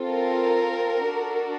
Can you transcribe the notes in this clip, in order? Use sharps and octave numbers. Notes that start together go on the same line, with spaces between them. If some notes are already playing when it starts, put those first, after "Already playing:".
Already playing: C4 F4 A4
A#4
D4 F#4 A4